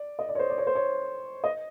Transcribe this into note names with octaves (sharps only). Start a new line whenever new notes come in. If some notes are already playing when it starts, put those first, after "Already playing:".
Already playing: D5
D#5
D5
C#5
C5
D5
C#5
C5
C#5
D#5